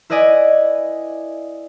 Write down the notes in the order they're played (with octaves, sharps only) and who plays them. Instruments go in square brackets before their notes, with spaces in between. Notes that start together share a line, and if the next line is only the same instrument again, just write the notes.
[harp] E4 B4 D5 D#5 G#5